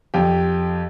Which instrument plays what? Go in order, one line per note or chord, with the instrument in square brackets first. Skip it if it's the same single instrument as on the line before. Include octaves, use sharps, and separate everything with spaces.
[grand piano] F2 G4